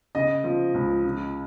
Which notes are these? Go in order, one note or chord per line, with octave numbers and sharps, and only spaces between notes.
C#3 D#5
F3
C#2
C#3